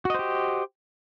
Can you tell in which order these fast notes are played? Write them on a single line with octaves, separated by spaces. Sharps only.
F#4 D#5 C5 G4